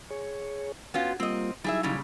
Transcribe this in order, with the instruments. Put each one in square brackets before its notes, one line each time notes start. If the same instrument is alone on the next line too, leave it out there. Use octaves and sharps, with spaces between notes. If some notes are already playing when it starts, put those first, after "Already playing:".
[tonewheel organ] G#4 C#5
[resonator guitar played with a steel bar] B3 C#4 F4 [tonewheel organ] F#4
[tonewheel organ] G3 A#3 F4 [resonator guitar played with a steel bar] C4 D#5
[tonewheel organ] F#3 D#4 E4 [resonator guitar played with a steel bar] G3 G#4 E5
[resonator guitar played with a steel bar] A#2 C#3 G3